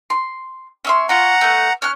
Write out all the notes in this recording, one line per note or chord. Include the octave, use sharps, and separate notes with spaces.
C6
C#4 E5 C6
C#4 F4 F#5 A#5
A3 B3
C#4 F6 F#6